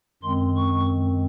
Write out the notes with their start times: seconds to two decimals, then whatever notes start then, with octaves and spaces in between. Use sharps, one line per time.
0.23 F#2 D#3 G#3 C4 C6
0.56 C#6